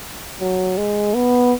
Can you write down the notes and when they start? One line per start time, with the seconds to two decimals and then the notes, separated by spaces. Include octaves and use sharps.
0.41 F#3
0.77 G#3
1.14 B3